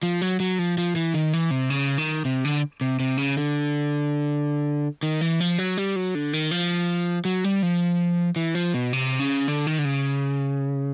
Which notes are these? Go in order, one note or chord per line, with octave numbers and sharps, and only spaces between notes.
F3
F#3
F#3
F3
F3
E3
D#3
E3
C3
C#3
D#3
C3
D3
C3
C3
C#3
D3
D#3
E3
F3
F#3
G3
F#3
D3
D#3
F3
F#3
G3
F3
E3
F3
B2
C3
C#3
D3
D#3
D3
C#3